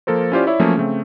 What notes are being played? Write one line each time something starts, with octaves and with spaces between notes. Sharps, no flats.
F3 A#3 A4 A#4 C5
C#4 E4 F4 G4 C5 D5
E4 C#5 D5 E5
F3 F#3 A3 A#3 C#4
C#3 A3 C4